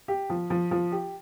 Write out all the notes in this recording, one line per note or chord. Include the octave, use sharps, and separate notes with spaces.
G4
F3
F3
F3
G4